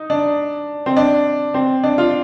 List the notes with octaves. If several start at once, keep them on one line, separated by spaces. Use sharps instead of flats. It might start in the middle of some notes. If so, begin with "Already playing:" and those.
Already playing: D#4
D4
C4
D4
C4
D4
F4